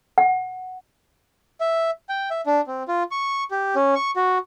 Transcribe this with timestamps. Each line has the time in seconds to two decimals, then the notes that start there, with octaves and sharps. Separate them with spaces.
0.18 F#5
1.61 E5
2.09 G5
2.31 E5
2.46 D4
2.67 C4
2.88 F4
3.11 C#6
3.51 G4
3.75 C#4
3.95 C#6
4.16 F#4